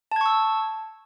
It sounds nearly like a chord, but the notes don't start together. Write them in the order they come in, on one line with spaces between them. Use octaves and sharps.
A5 G#6 C#6 E6